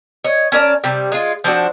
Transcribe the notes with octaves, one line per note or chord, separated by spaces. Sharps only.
C#5 D#5
C#4 A#4 D5 A5
C3 G3
G#3 F4
F3 C4 D4 F#4